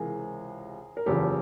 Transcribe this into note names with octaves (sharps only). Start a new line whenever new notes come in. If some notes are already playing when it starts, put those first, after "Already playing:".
Already playing: C#2 C3 E3 G#4 A#4
A#4
F#1 E2 C#3 F3 G4 A4